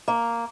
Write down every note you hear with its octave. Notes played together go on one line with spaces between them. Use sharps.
A#3